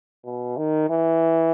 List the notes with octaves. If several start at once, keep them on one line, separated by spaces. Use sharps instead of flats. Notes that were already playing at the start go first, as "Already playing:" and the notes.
B2
D#3
E3